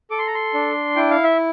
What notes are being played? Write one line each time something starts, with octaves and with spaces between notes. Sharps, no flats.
A4 D6
C6
A#5
C6
D4
E4 G5
F5
E5